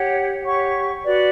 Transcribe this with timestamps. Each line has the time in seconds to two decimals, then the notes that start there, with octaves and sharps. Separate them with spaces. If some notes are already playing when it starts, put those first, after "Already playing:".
Already playing: G4 C#5 F#5
0.43 G4 C#5 F#5 C#6
1.04 F#4 B4 D5